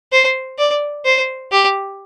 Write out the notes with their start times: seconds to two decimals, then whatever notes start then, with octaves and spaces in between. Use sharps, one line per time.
0.12 C5
0.58 D5
1.05 C5
1.52 G4